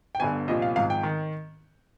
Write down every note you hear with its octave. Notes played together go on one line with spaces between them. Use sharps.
G5
G1 G2 D3 G#5
C2 A#2 F3 D#5
F5
G#1 G#2 F3 F5
G5
D#3